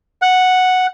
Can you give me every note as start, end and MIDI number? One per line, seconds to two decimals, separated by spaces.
0.22 0.86 78